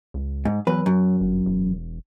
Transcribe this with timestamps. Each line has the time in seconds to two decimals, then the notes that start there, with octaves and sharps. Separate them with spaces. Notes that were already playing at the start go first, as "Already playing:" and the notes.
0.14 C#2
0.45 G#2
0.67 E2 F#3 B4
0.86 F#2
1.21 G1
1.46 E1